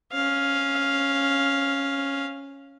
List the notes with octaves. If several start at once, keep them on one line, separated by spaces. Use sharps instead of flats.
C#4 F5